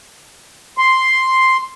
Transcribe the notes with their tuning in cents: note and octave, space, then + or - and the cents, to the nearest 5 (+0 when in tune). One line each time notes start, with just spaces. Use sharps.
C6 +0